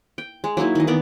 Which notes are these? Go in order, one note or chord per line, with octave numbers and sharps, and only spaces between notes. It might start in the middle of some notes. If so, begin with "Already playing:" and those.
G5
G#3
F#3 A#3 D#4 E4
D#3 E3 D#5
D#3 B3 D5